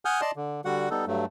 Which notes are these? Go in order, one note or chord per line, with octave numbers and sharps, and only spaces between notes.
F#5 G#5 D#6 F6 G6
D5 D#5 A5 C6
D3
D3 G3 F#4 F#5
G3 B3 D#4 A4
G2 F#3 A3